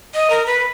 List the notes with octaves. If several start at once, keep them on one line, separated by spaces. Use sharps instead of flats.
D#5
A#4
B4